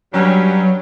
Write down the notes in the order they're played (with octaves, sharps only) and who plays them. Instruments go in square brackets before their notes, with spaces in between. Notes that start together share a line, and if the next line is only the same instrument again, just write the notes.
[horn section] G2 G3 C#4 [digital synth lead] F#3